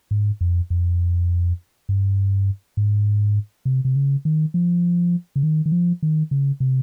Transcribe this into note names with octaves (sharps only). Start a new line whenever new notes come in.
G#2
F2
F2
G2
G#2
C3
C3
C#3
D#3
F3
C#3
D#3
D#3
F3
D#3
C#3
C3